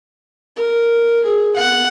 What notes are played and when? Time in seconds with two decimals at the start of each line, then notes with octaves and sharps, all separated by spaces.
0.56 A#4
1.24 G#4
1.56 F#5